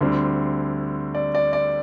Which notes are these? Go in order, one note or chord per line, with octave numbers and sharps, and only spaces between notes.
D2 D3 G3 C4
D5
D5
D5